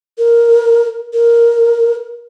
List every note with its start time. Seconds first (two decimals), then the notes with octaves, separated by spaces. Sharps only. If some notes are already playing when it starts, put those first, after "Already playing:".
0.18 A#4
1.13 A#4